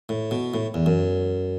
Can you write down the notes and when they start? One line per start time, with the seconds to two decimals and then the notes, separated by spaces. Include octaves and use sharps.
0.09 A2
0.31 B2
0.54 A2
0.74 E2
0.86 F#2